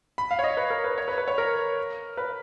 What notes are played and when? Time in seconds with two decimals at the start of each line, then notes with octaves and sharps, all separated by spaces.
0.18 B5
0.31 F5
0.39 C#5
0.44 D#5
0.57 B4
0.70 A#4
0.84 B4
0.98 C#5
1.08 B4
1.18 B4
1.28 C#5
1.38 A#4
2.17 B4